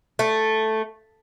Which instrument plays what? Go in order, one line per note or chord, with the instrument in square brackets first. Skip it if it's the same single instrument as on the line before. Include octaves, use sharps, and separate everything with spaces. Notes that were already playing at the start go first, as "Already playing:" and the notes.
[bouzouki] A3